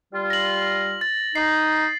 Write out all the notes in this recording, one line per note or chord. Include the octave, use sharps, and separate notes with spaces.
G3 F4
A#6 F#7
A6
D#4 C7